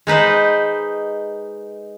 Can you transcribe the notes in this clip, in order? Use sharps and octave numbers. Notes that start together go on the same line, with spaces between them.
G#3 D#4 B4 C5